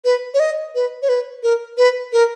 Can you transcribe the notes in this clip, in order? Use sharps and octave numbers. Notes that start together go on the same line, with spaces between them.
B4
C#5
D#5
B4
C#5
B4
A#4
B4
A#4